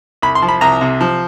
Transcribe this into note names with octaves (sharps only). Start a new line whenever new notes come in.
C2 B5
C6
F3
B5
C2 A#5
C3
F3